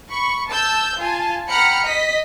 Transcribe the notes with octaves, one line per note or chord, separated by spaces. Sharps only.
B5 C#6
A5 E6 G6
F4 G#5 A5
F#5 G5 A#5 B5 F6 C#7
D#5 B6